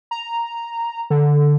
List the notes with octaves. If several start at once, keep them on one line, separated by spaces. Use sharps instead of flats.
A#5
D3